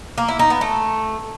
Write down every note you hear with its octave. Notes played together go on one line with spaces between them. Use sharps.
A#3
E4
D#4
B3
A3